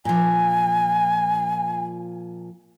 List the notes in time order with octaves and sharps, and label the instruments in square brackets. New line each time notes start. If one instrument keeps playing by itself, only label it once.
[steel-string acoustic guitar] A#2 F3 [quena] G#5